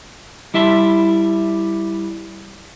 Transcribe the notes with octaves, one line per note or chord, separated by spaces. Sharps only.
G3 E4 E5 A5 C6